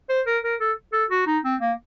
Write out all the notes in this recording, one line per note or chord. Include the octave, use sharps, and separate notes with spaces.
C5
A#4
A#4
A4
A4
F#4
D#4
C4
A#3